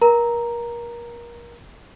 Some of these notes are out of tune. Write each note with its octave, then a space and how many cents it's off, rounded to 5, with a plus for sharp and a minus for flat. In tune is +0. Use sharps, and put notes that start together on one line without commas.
A#4 +30 A#5 +0